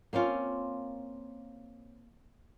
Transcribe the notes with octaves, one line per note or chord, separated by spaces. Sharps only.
A#3 C4 C#4 F4